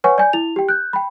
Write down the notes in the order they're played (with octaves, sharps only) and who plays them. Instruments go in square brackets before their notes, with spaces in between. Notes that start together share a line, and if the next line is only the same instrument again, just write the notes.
[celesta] B4 C#5 F#5 G#5 C#6
D5 G#5 G6
E4 F7
G4 G5
F#6 G6
G5 B5